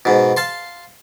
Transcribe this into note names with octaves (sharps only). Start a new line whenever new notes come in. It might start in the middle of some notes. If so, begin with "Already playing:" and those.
G#2 B2
F5 A5 C6